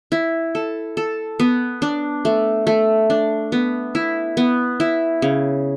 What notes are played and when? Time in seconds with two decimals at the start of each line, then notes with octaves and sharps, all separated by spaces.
0.12 E4
0.55 A4
0.97 A4
1.40 B3
1.82 D4
2.25 A3
2.67 A3
3.10 D4
3.52 B3
3.95 E4
4.37 B3
4.80 E4
5.22 C#3